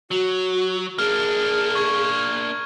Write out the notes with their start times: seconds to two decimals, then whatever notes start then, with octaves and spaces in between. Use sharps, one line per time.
0.11 F#3 F#4
0.98 A#3 D4 G#4 F6
1.75 C#6 G#6